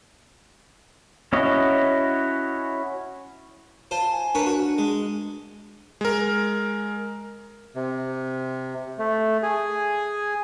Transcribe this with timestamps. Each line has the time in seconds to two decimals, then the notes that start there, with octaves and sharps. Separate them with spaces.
1.33 C#4 E4 F#4 C#5 D#5
3.91 F4 C5 A5
4.12 G#5
4.35 A#3 D4 B4 C#5
4.46 F#4
4.78 G#3
6.01 G#3 A#4
7.76 C3
8.99 A3
9.43 G#4